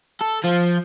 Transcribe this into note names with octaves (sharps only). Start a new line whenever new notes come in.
A4
F3